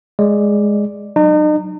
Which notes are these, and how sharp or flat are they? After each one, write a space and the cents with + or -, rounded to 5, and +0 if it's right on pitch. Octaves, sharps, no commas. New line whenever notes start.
G#3 +0 D5 +0
F#3 +0 D#4 -40